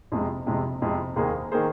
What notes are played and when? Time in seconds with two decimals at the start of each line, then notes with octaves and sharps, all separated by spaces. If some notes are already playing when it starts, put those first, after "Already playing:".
0.12 F2 C3 G#3
0.47 F2 C3 G#3
0.82 F2 C3 G#3
1.16 D#2 D#3 A#3 G#4 C5
1.52 D#3 A#3 G#4 C5